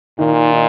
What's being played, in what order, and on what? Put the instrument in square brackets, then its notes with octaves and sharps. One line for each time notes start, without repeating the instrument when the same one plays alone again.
[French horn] A#2 [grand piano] D#3
[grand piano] D#4